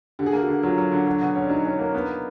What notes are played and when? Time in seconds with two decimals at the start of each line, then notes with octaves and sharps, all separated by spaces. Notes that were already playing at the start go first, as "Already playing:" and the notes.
0.19 D3 G4
0.26 G#4
0.33 A#3 G4
0.41 F#4
0.48 D3
0.63 F#3 F4
0.78 F#3
0.92 D3
1.07 F#3
1.22 B2
1.35 C#4
1.44 D4
1.50 F#3 D#4
1.65 C#4
1.79 A#3
1.94 B3